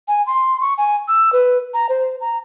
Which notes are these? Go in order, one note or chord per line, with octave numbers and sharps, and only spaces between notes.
G#5
C6
C#6
G#5
E6
B4
A#5
C5
A#5